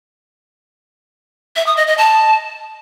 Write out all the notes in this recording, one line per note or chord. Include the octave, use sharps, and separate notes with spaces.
E5
D#6
D#5
D#5
A5